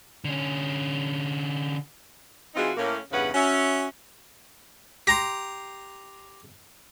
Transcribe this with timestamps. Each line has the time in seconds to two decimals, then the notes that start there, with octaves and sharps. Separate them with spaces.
0.25 D3 C#4
2.55 E3 C4 D#4 F4 F#4 G#4
2.77 A2 A#3 C#4
3.12 E2 G2 C#3 C#4 B4 F#5
3.34 C#4 F#4 E5
5.07 G4 A#5 C6 A#6